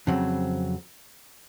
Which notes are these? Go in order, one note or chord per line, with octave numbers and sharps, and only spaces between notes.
F2 C#3 F#3 C4